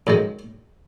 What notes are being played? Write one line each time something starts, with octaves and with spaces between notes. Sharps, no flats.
F#2 D#3 G#3